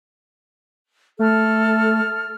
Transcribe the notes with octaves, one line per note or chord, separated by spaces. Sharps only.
A3 A4 F6